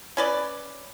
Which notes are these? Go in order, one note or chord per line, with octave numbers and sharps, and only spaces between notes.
C#4 B4 D5